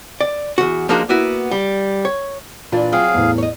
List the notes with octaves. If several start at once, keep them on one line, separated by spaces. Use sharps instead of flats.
D5
E2 F#4
F3 G#3 A#3 D4 D#4 F#4
A#3 B3 E4 F#4
G3
C#5
A#2 E3 D4 F4
F#3 C4 G#4 F5
E2 A2
C#5 D#5